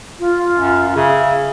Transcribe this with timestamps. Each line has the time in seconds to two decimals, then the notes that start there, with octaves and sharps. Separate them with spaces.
0.20 F4
0.56 F#2
0.96 C#3 E5